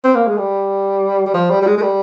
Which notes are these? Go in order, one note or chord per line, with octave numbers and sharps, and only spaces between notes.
C4
A#3
G#3
G3
G3
F3
G3
G3
G#3
G#3
G3